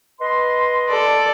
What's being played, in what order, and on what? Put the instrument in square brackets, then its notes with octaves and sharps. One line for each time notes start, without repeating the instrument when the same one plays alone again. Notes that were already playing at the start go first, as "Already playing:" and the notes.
[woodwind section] B4 D#5 C6
[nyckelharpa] A4 D5